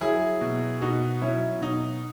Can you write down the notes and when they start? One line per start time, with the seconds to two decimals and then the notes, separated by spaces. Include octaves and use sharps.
0.01 F#3 E4 G#4
0.41 B2
0.81 B2 D#4 F#4
1.21 F#3 C#4 E4
1.61 B2 D#4